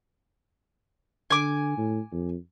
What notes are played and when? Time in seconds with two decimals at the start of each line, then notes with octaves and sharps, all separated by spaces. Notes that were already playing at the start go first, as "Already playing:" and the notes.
1.30 D3 G#5 D6
1.77 A2
2.12 F2